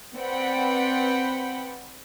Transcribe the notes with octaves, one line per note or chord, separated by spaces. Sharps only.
C4 B4 D5 F#5 G5 B5